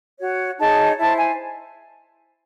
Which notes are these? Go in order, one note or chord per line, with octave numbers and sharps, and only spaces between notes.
F#4 C#5
D#4 G#4 C#5 A5
E4 C5 A5
G#5